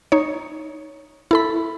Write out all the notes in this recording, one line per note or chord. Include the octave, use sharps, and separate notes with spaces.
D#4 C#5
E4 A4 B5